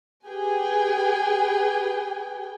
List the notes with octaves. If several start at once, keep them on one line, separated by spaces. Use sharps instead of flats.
G4 G#4 B4 G5 G#5